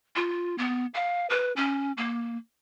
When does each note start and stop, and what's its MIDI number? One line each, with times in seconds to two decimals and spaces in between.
0.16 0.56 65
0.58 0.86 59
0.94 1.26 77
1.30 1.52 71
1.56 1.92 61
1.97 2.37 58